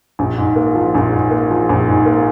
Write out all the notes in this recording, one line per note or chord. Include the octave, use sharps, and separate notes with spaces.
A#1
G#2
A#3
F3
A#1
G#2
A#3
F3
A#1
G#2
A#3